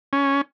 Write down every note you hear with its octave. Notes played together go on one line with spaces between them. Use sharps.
C#4